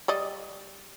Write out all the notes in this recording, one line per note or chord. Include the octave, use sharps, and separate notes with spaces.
G3 D5 D#5